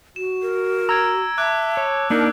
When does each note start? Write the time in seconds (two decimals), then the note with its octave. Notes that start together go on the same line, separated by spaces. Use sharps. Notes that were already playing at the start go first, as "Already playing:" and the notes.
0.16 F#4 E7
0.42 A#4
0.89 A#5 E6 G#6 D7
1.38 E5 A5 D6 F#6 D7
1.77 C#5
2.10 A#3 D4 D#4 A#4